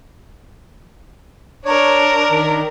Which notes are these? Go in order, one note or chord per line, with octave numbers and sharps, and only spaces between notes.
D4 A#4 C#5
D#3